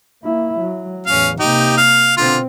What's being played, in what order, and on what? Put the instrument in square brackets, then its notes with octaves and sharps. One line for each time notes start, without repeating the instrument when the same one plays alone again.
[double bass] A#3 E4
F#3
[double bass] A1 E2 [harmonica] C#4 F5
[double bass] C3 A#3 [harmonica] D#4 G4
[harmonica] F5
[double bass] B2 C4 [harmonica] D3 F4